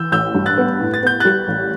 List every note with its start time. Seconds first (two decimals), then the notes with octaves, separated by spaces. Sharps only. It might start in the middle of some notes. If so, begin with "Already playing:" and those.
Already playing: E3 E6 G6
0.12 A1 E6 G6
0.34 G2
0.46 F#6 A6
0.58 B3
0.81 A2
0.94 A6
1.03 B3 G6
1.20 G3 F#6 A6
1.48 A1